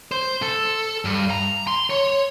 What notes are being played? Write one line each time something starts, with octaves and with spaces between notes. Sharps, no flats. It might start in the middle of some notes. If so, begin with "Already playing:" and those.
C5
A4
G2
A#5
C6
C#5